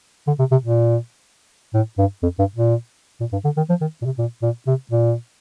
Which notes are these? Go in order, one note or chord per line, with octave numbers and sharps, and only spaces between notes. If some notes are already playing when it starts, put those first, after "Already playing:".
D3
C3
C3
A#2
A2
G2
F2
G2
A#2
A#2
G2
D3
D#3
F3
D#3
A#2
C3
A#2
A#2
C3
A#2